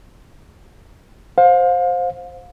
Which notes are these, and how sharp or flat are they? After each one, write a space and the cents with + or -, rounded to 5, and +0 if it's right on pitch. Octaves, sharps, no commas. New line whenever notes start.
C5 +5 F5 +30